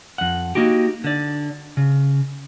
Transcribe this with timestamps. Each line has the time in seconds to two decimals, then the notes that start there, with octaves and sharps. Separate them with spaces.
0.18 F2 F#5
0.55 A#3 D#4 F#4 G4
1.04 D3 D5
1.77 C#3